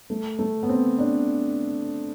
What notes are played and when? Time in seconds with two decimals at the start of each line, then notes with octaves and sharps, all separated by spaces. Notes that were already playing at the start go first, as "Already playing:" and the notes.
0.10 A3
0.39 A3
0.63 B3
0.69 C4
0.99 D4